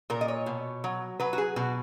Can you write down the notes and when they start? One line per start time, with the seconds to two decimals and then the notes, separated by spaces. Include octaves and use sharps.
0.10 A#2 A#4
0.21 D#5
0.28 C#5
0.46 B2
0.84 F#3
1.20 F#3 B4
1.33 F#4
1.38 G#4
1.56 B2 F#4